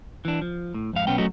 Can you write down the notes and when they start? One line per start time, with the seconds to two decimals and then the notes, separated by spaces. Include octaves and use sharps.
0.25 E3 D4
0.41 F3
0.74 A2
0.93 F2 G#2 F5
1.07 B1 B3 C#4 G5
1.18 F#3 A3 C#4 F#4 D#5